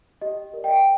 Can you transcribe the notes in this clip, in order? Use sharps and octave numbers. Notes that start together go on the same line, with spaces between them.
G4 D#5
A#4 D5
D#5 G5